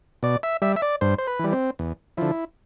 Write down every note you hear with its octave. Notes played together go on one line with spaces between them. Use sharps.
B2 D5
E5
G3 E5
E5
D5
G2 C5
C5
B4
E3 G3
C4
E2
D3 F3 E4